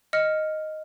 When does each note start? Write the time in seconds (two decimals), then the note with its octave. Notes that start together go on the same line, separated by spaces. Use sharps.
0.13 D#5 F6 C#7